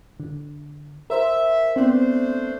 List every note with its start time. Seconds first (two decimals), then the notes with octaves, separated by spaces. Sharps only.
0.20 D3
1.10 A#4 C5 E5
1.76 A3 B3 C4 D4 C5